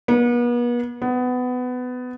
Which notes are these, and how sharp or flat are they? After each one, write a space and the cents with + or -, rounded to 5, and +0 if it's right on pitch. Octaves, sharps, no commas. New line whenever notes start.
B3 -40
B3 +20